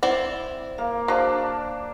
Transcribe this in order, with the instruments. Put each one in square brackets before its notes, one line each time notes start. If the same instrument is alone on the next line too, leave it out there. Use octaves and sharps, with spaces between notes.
[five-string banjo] C4 E4 D5 [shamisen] F#5
[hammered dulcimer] A#3 [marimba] F5
[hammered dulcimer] D4 [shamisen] F#4 G#4 [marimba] C5 F5